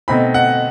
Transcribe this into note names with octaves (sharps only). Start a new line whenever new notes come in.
B2 A3 C4 D#4 B5
F#5